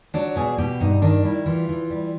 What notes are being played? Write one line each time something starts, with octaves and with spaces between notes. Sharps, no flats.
F#3 D4
B2 G#4
B2 G4
G2 D#4
D#3 D4
G3 E4
E3 F4
E3
G3